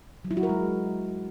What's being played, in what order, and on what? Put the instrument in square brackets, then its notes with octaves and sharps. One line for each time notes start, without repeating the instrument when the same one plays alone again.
[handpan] F#3
E4
F#4
A#4
G#3